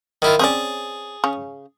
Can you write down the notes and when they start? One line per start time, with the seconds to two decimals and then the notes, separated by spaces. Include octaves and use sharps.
0.22 D#3 E4 F4
0.39 C4 C#4 G#4 D5 A5
1.24 C#3 C#4